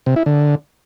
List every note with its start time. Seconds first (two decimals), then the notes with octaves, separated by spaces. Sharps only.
0.06 C3
0.16 E4
0.26 D3